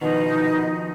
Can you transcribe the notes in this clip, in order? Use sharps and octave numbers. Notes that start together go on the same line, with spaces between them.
B2 D#3 F3 D#4